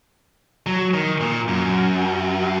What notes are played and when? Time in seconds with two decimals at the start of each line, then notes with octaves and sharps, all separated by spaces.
0.66 F#3
0.94 D#3
1.21 A#2
1.48 F#2